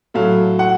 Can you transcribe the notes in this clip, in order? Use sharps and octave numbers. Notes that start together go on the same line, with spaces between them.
A2 F#3 A3 F5
F#5